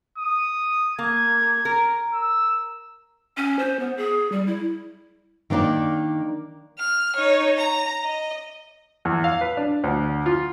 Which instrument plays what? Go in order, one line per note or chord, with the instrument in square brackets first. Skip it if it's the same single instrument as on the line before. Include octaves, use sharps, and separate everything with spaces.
[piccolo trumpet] D#6
[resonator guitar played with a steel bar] A#3 [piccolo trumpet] G#6
[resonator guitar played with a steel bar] A#4
[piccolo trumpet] E6
[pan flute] C#4
C5
B3
G#4
G3
E4
[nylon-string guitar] D#3 A#3 D4 D#4 D5
[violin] F6
D#4 C#5
A#5
D#5
[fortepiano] E2
F5
B4
D4
D2
F4